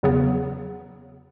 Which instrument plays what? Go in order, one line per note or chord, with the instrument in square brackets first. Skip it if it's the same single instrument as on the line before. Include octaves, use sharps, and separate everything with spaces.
[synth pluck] E2 C#3 F#3 B3